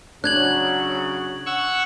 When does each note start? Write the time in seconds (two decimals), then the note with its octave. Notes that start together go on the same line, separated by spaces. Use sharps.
0.24 C#3 F#3 D4 F#6 G#6 F#7
1.46 F#5 C#6 E6